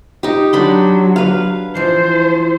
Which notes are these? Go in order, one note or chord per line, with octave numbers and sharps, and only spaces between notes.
D#4 G4
F#3 D4 B5 C6
B4 F5
E3 F3 C5